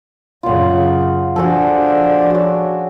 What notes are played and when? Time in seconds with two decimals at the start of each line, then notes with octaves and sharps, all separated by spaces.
0.43 F#2 C#3 F4 F#5
1.36 F3 D4 F#4 G#4 A4
2.30 F#4 C#5